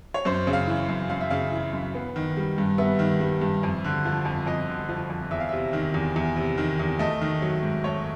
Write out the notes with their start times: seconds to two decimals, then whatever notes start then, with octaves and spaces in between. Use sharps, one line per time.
0.14 C#5
0.25 F#2 C5
0.47 C#3
0.53 F5
0.67 E3
0.89 F#2
1.09 F#2 F5
1.21 E5
1.30 C#3 F5
1.52 E3
1.73 F#2
1.94 B3
2.16 D#3
2.37 G3
2.58 G2
2.78 B3 E5
2.99 D#3
3.20 G3
3.41 G2
3.63 F2
3.84 D3
4.05 F3
4.25 F2
4.46 F2 D#5
4.68 D3
4.89 F3
5.10 F2
5.31 E2 E5
5.40 F5
5.49 C3 E5
5.73 D#3
5.94 E2
6.16 E2
6.36 C3
6.58 D#3
6.79 E2
6.99 A3 D#5
7.21 D#3
7.42 F#3
7.63 G#2
7.84 A3 C#5